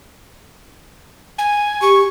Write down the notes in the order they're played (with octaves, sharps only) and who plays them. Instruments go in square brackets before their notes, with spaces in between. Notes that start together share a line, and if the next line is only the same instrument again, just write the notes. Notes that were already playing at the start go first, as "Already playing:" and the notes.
[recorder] G#5
[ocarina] G4 [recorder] C#6